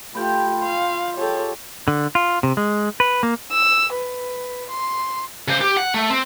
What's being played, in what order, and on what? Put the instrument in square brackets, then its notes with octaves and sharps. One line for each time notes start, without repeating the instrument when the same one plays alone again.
[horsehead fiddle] A3 G4 [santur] F4 G5 B5
[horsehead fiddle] F5 [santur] C6
[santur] G#3 G4 [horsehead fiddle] A4 C#5
[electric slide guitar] D3
F4
C3
G#3
B4
A#3
[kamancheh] E6
B4
C6
[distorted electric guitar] C#3 C5
G4
F#5
A3
C4